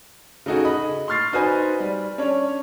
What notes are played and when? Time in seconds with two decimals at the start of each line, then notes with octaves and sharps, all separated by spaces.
0.46 C#3 A3 D#4 F#4 G#4
0.65 D#5 B5
1.08 C6 C#6 F6 A6 C7
1.33 D#4 F#4 B4 C5 G#5
1.80 G3
2.18 C#4 D4 C#5